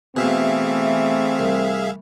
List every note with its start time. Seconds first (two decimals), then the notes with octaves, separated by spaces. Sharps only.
0.16 B2 E3 A3 C4 G#4 E5 F5
1.39 C2